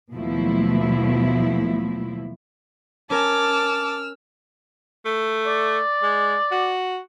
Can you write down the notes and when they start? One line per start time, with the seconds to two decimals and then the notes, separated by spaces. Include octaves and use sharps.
0.13 D#2 B2 F3 F#3 A3 E4
3.10 C#4 A#4 G#5 A5 D6 E6 F6
5.05 A3
5.46 D5
6.03 G#3
6.51 F#4